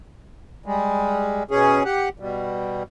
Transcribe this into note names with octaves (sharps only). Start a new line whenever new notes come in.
G3 G#3
B2 C#4 G#4
G4 F#5
B2 G3